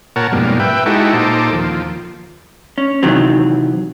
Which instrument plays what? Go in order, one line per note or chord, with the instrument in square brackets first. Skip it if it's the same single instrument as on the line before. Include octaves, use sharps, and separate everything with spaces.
[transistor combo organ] A#2 A#4 C#5 F#5 A5
F2 G#2 B2 G3 A#3
B4 E5 G5
G#3 D#4 E4 F#4 G4 A4
A#2 D#4 A4 C5 D6
D#2 F3
[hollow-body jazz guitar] C#4
C3 D#3 E3 F#3 C4